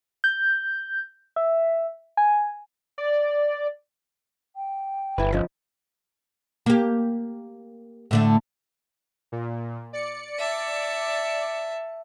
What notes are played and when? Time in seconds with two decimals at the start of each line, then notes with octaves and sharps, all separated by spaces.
0.24 G6
1.36 E5
2.17 G#5
2.98 D5
4.55 G5
5.18 G1 E4 B4
5.33 C#3 F3 D#5
6.66 A#3 G4
8.11 A2 D3 A3
9.32 A#2
9.93 D5 C#7
10.38 E5 A5